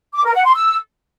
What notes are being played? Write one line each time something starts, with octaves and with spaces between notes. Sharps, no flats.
D6
A#4
F#5
C6
E6